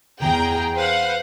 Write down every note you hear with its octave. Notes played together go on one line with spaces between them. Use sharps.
E2 G#4 G5 A#5
B4 C5 F5 F#5